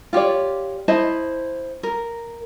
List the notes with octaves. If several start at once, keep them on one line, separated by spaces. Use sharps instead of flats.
F4 G4 C#5 D5
E4 C5 D#5 A5
A#4